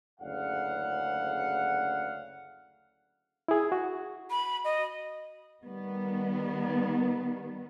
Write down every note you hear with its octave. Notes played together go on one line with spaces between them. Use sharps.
F#1 D2 C#3 F5 F#5
E4 G#4
F#4
B5
D#5
D#3 G3 B3